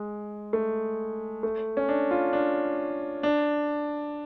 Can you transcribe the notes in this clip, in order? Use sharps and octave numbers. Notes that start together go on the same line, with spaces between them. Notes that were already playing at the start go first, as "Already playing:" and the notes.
Already playing: G#3
A3
A3
C#4
D4
F4
D4
D4